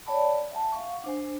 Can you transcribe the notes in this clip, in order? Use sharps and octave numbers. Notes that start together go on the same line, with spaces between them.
C#5 D5 G5 A5 B5
E5 F#5 G#5 A5
F5 F#5 C#6
D4 C5 G#5